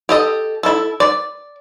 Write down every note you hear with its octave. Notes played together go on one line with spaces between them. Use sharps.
G4 A4 D#5
E4 A4
D5